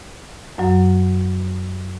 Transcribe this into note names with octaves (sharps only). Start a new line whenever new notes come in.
F#2 F#3